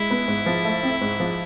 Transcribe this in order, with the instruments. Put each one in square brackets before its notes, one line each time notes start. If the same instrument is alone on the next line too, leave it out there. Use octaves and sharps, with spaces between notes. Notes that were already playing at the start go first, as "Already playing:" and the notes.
Already playing: [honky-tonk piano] G#3 [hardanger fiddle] E4
[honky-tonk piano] B3
G#2
F3
A3
C4
G#2
F3